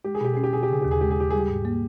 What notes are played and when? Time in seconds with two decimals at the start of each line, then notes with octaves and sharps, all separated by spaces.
0.04 G#3 G4
0.15 G#4
0.21 B2 G4
0.34 C#4 G#4
0.44 G4
0.53 B2 G#4
0.63 G4
0.69 C#3 G#4
0.82 D#2 G4
0.91 G#4
1.01 G#3 G4
1.11 G#4
1.17 D#2 G4
1.30 G3 G#4
1.39 G4
1.49 G#2
1.65 A#3